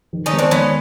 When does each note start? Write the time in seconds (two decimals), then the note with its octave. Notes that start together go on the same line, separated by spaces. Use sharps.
0.13 D#3
0.26 C#4 D#4
0.32 G#3 B3
0.39 C4 D4
0.51 D#3 B3 C#4